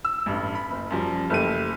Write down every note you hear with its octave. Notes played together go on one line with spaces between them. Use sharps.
E6
A1 G2
B5
F#1
F#2 F3 G3
F#1 A3 G4 D#7